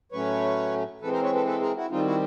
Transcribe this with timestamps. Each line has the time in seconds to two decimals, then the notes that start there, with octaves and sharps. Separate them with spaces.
0.12 A2 F#3 A3 C#4 B4 C#5
1.01 E3 G#3 C4 A4 B4
1.13 A#4 C5
1.23 B4 C#5
1.34 A4 B4
1.46 A4 B4
1.61 G#4 A#4
1.76 E4 F#4
1.90 D#3 G3 C4 D#4 F4
2.05 E4 F#4